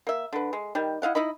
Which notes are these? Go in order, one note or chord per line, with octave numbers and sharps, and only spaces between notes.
A#3 E5
D3 B4
G#3
D#3 G3
E4 D#5 F5 F#5
D#4 E4 D#5 B5